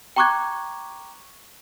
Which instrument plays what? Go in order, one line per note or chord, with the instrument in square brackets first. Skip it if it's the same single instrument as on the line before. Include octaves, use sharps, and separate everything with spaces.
[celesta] G5 A#5 C#6 D6 F#6 G#6